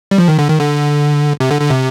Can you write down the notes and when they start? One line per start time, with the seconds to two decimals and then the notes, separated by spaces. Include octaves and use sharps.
0.11 G3
0.18 F3
0.28 D#3
0.39 D3
0.49 D#3
0.60 D3
1.40 C3
1.51 D3
1.61 D3
1.70 C3